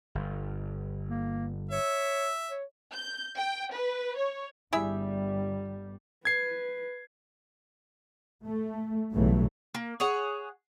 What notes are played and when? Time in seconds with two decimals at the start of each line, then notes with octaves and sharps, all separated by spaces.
0.15 G1
1.09 A#3
1.71 C#5 E5
2.50 C#5
2.92 G6
3.37 G5
3.73 B4
4.18 C#5
4.73 G1 G3 E4 G#4 E5
6.25 B4 G#6 C7
8.44 A3
9.11 B1 G2 C#3 E3 F#3 A3
9.74 A#3
10.00 G#4 C#5 F#5